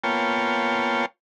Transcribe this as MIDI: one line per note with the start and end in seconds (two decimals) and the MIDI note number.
0.04 1.06 58
0.04 1.06 59
0.04 1.06 65
0.04 1.06 73
0.04 1.06 79
0.04 1.06 81